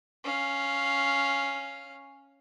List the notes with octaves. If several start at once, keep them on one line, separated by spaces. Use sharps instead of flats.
C#4 F5